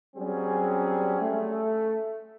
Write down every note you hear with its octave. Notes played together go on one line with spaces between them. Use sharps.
F#3 G3 C4 C#4 G#4
A3